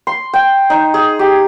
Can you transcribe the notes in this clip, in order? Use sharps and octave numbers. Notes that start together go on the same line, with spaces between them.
C6
G5
D#4
G#4
G4